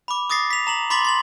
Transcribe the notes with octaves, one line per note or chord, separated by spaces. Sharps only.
B5 D6
D6 D#6 A6 A#6 C7
B6 F7
A#5 F7 F#7
B5 C6 D6 A6 B6 F#7
C6 A6 F#7